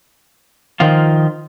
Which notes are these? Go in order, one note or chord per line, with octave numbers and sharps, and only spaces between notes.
D#3 F3 F4